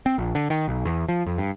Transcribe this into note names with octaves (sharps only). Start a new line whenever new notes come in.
C4
A#1
D3
D#3
B1
E2
F3
F2
G2